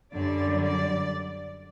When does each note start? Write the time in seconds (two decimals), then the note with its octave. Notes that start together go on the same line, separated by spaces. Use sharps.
0.14 F#2 D3 G3 D5
0.63 D5